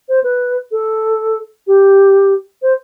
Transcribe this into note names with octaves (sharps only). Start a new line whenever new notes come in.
C5
B4
A4
G4
C5